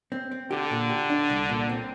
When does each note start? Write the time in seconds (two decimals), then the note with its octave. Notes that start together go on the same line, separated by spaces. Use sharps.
0.12 C4
0.31 C4
0.51 D3 G4
0.71 A#2
0.90 G4
1.10 D4
1.30 C2
1.49 A#2
1.69 C4